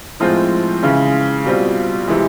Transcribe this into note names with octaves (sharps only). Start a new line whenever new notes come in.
A2 F3 G#3 C4 F4
C#3 E3 G#3 C#4
B2 G3 C4 F4
C3 E3 G#3